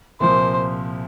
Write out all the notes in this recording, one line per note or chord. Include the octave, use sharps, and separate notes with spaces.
C2 A#2 F3 C5